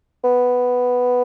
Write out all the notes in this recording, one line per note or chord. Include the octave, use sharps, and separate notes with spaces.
B3